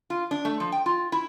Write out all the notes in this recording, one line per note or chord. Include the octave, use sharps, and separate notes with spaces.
F4
D4
A3
F3
G5
F4
E4